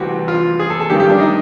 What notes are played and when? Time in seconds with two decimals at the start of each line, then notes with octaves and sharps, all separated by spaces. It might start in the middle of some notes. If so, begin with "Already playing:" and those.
Already playing: C2 C3 E3 F#4 G4
0.28 F4
0.59 G#4
0.70 A4
0.80 A4
0.90 G#1 G2 D#3 G4
1.00 G4
1.10 D4
1.20 D#4